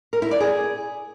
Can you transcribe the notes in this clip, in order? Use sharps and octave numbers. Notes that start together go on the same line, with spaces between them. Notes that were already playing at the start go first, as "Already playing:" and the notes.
A#4
E4
D5
G#4